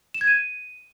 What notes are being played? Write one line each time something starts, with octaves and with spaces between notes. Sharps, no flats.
E7
G#6
D#7